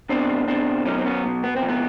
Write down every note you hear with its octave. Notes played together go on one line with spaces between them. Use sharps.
B2 C4 D4
B2 C4 D4
F#3 C#4 D#4
C4
B3 C#4
B2
B3
C4
F2
B3